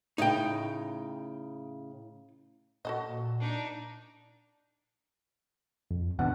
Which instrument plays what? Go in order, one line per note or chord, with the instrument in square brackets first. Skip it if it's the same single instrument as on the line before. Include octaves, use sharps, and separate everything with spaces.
[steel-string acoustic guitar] A2 C#3 [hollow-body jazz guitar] D#4 G5
[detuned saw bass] A#2 [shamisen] F#4 A4 D#5
[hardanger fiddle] D4 D#4
[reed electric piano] F2
[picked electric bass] E2 B2 D3 [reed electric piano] F#5